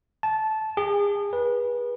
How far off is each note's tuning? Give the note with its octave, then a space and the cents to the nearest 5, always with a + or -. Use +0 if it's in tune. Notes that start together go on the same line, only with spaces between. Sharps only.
A5 -15
G#4 -35
B4 -30